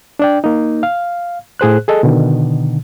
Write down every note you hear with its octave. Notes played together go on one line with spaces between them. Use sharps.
D4 D5 G5
A#3 D#4
F5
A2 G#4 C5 F#6
G#4 A4 D#5
B2 D3 D#3